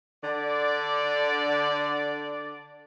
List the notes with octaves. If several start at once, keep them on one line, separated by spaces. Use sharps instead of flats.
D3 D5